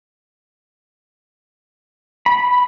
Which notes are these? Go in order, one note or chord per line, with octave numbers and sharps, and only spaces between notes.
B5